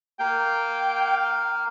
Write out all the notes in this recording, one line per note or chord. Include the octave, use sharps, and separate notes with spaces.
A#3 F5 G5